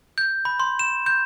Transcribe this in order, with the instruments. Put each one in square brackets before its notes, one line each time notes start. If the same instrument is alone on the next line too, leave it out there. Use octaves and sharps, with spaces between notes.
[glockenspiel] G6
B5
C6
E7
G6